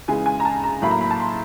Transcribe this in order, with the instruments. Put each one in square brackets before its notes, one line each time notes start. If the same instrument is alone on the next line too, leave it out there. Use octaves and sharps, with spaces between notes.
[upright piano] C#3 E3 G#3 G#5
G#5
A#5
A5
A#5
A2 F#3 A#3 B5
A#5
B5
A5
C6